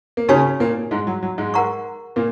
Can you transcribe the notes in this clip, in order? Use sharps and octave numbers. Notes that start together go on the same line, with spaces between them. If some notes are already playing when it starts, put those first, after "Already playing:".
A#3
C#3 C#4 D#4 F#4 C#5 G#5 C#6
A#2 A#3
G#2 G#3
F#3
F#3
G#2 G#3
A#4 F#5 A#5 C#6
A#2 A#3